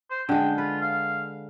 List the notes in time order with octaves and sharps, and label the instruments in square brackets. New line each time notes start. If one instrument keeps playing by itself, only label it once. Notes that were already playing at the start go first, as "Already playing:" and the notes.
[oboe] C5
[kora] D3 G#3 [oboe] G5
[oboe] F4 [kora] B4
[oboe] F5